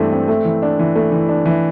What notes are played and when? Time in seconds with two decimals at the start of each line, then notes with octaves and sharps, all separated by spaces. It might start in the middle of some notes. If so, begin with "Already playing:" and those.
Already playing: G2 E3 A3 C4
0.12 C4
0.28 A3
0.45 E3
0.62 D4
0.79 E3
0.95 A3
1.12 E3
1.29 D4
1.45 E3